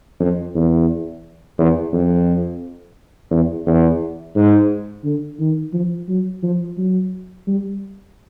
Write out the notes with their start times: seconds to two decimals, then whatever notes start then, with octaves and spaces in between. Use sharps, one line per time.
0.20 F2
0.55 E2
1.58 E2
1.93 F2
3.31 E2
3.66 E2
4.35 G#2
5.04 D3
5.39 D#3
5.73 F3
6.08 F#3
6.43 F3
6.77 F#3
7.47 G3